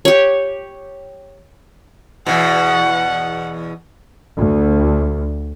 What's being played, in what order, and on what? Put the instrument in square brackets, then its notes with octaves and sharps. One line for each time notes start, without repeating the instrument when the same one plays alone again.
[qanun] G4 C#5
[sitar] E2 B2 [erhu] F#5
[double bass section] D2